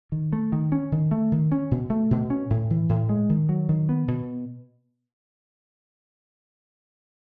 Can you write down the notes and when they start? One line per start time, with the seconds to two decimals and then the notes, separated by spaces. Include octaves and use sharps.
0.12 D#3
0.33 A3
0.52 D#3
0.72 C#4
0.92 D#3
1.11 A3
1.32 D#3
1.52 C#4
1.71 B2
1.90 A3
2.11 B2
2.30 C#4
2.50 A2
2.70 E3
2.89 A2
3.09 G#3
3.29 D#3
3.49 F#3
3.69 D#3
3.89 B3
4.08 B2